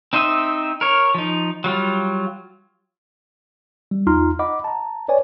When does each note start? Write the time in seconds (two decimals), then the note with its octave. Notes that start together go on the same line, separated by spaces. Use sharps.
0.13 C4 D#4 C5 D#5 E5
0.81 A#4 C#5
1.15 F3 D#4
1.64 F#3 G3 F4
3.91 G3
4.07 E2 D#4 F4 A#5 C6 F6
4.39 D#5 F#5 B5 D6
4.64 A5 A#5
5.08 B4 C#5 D5 G#5